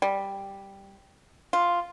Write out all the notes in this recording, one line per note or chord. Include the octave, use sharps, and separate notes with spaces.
G3
F4